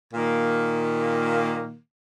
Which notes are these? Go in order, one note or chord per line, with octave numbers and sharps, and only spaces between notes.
A#2 D#3 A#3